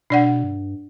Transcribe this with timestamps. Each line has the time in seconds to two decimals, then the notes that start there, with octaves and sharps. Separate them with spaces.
0.10 B2 D4 D5 F#5
0.44 G2